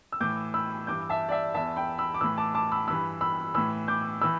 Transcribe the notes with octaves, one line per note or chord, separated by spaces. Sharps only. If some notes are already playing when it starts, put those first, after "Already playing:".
E6
A2 E3 D6 G6
B5 E6
G2 E3 D6 G6
E5 A5
D5
E5
E2 E3 E5 A5
G5 B5
B5 E6
D6
A2 E3 B5 E6
A5 D6
A5 D6
B5 E6
G2 E3 B5 E6
B5 E6
A2 E3 B5 E6
D6 G6
E3 B5 E6